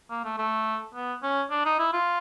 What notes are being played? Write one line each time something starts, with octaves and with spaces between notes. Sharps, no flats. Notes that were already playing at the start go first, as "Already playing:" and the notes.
A#3
A3
A3
B3
C#4
D4
D#4
E4
F4